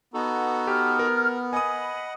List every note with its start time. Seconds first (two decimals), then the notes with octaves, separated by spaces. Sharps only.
0.14 B3 D#4 F#4 A4
0.67 G4 F6
0.99 A#4
1.53 D#5 F#5 G#5 B5 D#6